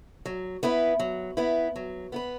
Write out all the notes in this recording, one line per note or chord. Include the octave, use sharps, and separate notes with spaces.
F#3
B3 E4 B4
F#3
B3 E4 B4
F#3
B3 E4 B4